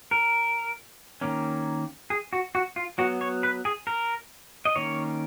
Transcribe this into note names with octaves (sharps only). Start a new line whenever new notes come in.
A#4
D#3 A#3 C#4
G#4
F#4
F#4
F4
F#3 B3 F#4
C#5
B4
G#4
A#4
D#5
D#3 A#3 C#4 C#5